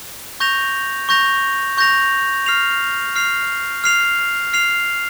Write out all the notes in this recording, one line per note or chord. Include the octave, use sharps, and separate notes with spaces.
C#6 G6 A#6 F7
C#6 G6 A#6 F7
C#6 G6 A#6 F7
F6 C7 F7
F6 C7 F7
F6 C7 F7
F6 C7 F7